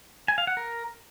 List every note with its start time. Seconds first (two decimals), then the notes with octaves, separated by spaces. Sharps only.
0.28 G#5
0.38 F5
0.47 F#5
0.57 A#4